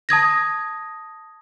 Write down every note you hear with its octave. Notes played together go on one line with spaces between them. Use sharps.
A5 D#6 G#6 A#6